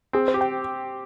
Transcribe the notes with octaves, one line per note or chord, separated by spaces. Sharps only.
C4 G#4
C5
G4
G5